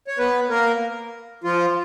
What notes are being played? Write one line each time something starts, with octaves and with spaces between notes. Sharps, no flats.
C#5
B3 B4
A#3 A#4
F3 F4